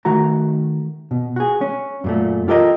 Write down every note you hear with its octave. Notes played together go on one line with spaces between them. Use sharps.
D#3 A3 F#4 A#5
B2
F#4 G#4
C#4
F#2 A#2 A3
F4 G4 A4 A#4 C5 D#5